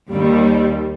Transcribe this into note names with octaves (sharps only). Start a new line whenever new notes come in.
D#2 G3